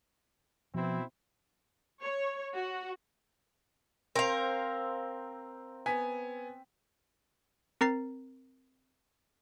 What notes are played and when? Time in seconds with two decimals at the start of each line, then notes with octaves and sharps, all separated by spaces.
0.74 B2 F3 C4 E4
2.02 C#5
2.55 F#4
4.16 C4 A#4 C5 F5
5.86 B3 G#5 B6
7.81 C4 A#4 A#5 A6 C7